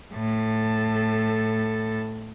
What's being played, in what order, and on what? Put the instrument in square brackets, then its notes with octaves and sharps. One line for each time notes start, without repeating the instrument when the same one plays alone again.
[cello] A2 A4